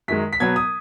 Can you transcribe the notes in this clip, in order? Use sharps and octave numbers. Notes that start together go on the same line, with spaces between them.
F#2 D#3 G#3 B6
B6
B2 F#3 B3 G#6
D#6